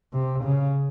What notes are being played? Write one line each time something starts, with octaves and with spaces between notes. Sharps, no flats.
C3
C#3